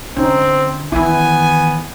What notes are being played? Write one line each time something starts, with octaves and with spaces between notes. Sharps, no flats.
D3 C4 C#4 D#4
D#3 E3 B3 E4 G#5